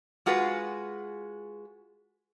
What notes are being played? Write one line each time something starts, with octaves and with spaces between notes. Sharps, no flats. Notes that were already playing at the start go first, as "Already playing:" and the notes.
G#3 F4 F#4 G#4 B4